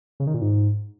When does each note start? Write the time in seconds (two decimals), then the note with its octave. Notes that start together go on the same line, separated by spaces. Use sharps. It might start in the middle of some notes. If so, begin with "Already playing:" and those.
0.20 C#3
0.27 D#3
0.34 A#2
0.41 G#2